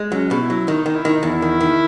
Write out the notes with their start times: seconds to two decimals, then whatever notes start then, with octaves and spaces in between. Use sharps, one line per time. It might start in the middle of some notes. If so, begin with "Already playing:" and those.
Already playing: G#3
0.12 F#3 C#4
0.31 B2
0.40 E4
0.50 F#3
0.68 D#3 D#4
0.86 D#3
0.95 E4
1.05 D#3
1.13 D#4
1.23 E2 E4
1.42 D#3
1.61 D#3